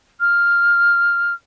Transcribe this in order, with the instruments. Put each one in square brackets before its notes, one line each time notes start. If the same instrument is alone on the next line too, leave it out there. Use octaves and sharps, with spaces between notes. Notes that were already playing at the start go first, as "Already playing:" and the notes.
[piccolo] F6